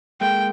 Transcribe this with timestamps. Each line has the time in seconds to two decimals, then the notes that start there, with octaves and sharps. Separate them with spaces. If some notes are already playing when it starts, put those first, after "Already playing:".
0.21 G#3 A#3 G5